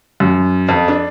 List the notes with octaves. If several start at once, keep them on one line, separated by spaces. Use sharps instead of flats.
F#2
F2
D4